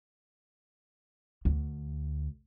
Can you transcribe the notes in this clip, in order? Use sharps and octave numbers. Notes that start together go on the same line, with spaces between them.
D2